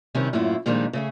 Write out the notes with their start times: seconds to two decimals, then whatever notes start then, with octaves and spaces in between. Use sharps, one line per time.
0.15 C3 D#3 G3 C4 C#4 E4
0.33 F#2 A2 A#3 E4 F4
0.66 A#2 D#3 F3 G3 G#3 D4
0.93 C#3 A3 G#4